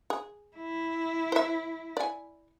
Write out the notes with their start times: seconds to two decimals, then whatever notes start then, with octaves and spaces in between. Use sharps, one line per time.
0.10 G#4
0.57 E4
1.32 C5 E5
1.97 D5 G#5